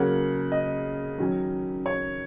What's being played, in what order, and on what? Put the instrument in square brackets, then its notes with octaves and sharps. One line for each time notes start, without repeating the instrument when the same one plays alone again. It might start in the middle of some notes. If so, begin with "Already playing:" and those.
Already playing: [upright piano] C#3 F#3 A#3 C#4 F#5
D#5
D#3 F#3 C#4
C#5